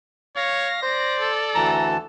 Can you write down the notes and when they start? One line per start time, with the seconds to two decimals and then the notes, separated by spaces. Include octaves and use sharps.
0.36 C#5 F5 A#6
0.83 C5 D5
1.20 A4
1.55 D2 E3 A5 A#5